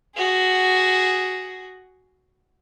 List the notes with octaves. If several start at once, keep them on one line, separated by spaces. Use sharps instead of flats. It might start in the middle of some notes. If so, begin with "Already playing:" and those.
F#4 G#4